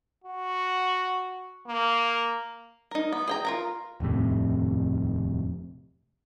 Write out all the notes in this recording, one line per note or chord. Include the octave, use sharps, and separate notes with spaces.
F#4
A#3
D#4 A#4
B3
G#4 G5 A#5
F4 A#4 A#5
D#1 F2 A2 C3